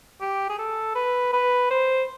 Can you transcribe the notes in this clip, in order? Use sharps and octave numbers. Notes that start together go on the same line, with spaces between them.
G4
G#4
A4
B4
B4
C5